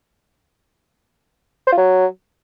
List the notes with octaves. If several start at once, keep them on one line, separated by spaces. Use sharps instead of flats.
C5
F4
F#3